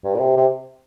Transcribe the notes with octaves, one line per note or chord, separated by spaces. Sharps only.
G2
A#2
C3
C3